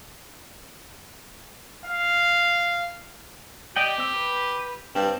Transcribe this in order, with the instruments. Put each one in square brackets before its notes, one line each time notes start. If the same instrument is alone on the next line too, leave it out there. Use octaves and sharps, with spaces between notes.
[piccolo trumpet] F5
[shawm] G4 [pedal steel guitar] D5 D#5 G5
[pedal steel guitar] C4 E6
B4
[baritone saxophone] G2 [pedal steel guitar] C4